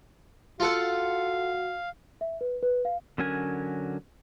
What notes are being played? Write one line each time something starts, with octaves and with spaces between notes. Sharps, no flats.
F4 F#4 A4 F5 F#5
E5
B4
B4
F5
D3 F#3 C#4 A#4 G#5